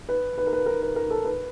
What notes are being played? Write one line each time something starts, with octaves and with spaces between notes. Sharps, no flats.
B4
B4
A#4
B4
A#4
B4
A#4
A4
B4